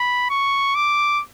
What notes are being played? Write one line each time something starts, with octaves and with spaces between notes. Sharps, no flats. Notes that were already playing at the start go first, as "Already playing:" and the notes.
Already playing: B5
C#6
D6